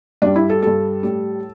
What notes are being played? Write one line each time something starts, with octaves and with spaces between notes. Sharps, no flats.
G2 G3 D4
E4
A4
G2 G3 A4
A2 G3